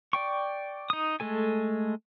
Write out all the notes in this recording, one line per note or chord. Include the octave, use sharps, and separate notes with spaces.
D5 G5 C#6
D#4 D#6
G#3 A3 A4 G#5